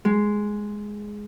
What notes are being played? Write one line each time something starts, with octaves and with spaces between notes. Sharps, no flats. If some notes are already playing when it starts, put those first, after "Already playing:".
G#3